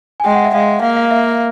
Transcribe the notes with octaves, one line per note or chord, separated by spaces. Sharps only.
G#5
G#3 G5
F#5
E5
G#3 F5
A#3 F5
F5
E5